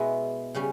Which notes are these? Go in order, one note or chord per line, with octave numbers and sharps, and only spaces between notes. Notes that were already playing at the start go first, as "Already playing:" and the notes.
Already playing: B2 G#3 B3 E4
C#3 G3 C#4